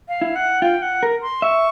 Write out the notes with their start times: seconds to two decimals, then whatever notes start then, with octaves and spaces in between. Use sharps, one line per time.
0.08 F5
0.21 E4
0.35 F#5
0.62 F4 G5
0.82 F#5
1.03 A#4
1.22 C6
1.42 E5 C#6